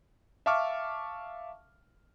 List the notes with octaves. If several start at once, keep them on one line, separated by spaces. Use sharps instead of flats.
E5 F5 A5 C#6 D6 F6